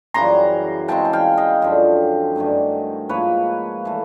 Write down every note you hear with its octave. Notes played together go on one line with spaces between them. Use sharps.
F#2 C#3 E3 G3 A#5 C6
C#3 E3 G#3 C4 G5 A5
G#5
F5 G5
D#5 F5
F#2 D3 F3
G2 D#3 F#3 A3
G#2 F3 A#3 B4 C#5
E3 A3